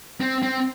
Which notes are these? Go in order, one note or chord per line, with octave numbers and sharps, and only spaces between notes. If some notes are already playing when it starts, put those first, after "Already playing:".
C4
C4